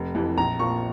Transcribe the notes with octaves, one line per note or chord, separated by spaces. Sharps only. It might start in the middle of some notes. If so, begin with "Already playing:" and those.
Already playing: F1
F2 C3 E3
A#1 A#5
A#2 F3 C#6